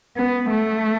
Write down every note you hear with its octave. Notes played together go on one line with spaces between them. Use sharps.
B3
A3